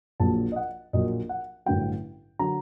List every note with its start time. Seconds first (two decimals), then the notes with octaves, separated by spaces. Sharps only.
0.20 A#1 A#2 F#3 A5
0.52 D#5
0.56 F#5
0.93 A#1 A#2 F#3 D#5
1.29 F#5
1.66 A1 G2 D3 F#3 G5
2.39 D3 F#3 A#5